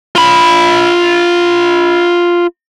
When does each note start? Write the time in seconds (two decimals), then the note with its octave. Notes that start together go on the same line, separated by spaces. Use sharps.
0.15 F4 B5